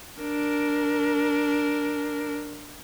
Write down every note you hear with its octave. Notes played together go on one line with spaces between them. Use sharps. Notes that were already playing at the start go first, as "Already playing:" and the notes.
D4 A#4